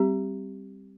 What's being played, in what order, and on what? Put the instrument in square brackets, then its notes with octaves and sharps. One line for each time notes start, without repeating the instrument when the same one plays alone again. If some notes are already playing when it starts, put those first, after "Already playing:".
Already playing: [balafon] G3 C4 G4